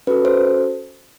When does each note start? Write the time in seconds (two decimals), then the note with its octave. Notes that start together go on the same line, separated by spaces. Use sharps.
0.07 C#4 F#4 A4 B4
0.25 C5